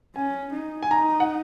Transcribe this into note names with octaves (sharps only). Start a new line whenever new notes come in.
C#4 G#5
D#4
G#5
D#4 A#5
F#5